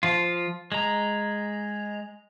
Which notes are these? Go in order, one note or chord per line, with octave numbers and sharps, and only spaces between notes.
F3 F4
G#3 A#5